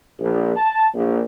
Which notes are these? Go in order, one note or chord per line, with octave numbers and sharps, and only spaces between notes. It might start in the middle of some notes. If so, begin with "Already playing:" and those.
A#1
A5
A#1